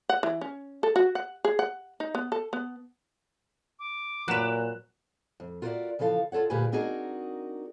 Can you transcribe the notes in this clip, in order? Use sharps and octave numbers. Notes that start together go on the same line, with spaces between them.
F#5
E3
C#4
A4
F#4
F#5
G#4
F#5
D#4
B3
A4
B3
D6
A#2 F#3 B4 F#6 E7 F7
F2
F4 F#4 A#4 C5 D5 E5
C#3 E3 F3 A4 F5
F4 A4 C#5 F#5
D2 A#2 G4 G#4 B4 G#5
C4 D4 D#4 F#4 G#4 A#4